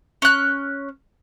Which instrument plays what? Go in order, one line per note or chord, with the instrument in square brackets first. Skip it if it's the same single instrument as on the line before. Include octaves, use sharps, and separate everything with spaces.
[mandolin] C#4 F#6